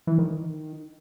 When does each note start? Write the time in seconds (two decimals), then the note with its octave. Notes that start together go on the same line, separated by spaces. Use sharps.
0.07 E3
0.18 D#3